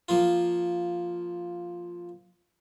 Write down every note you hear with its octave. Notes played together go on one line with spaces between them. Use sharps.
F3 A#3 F4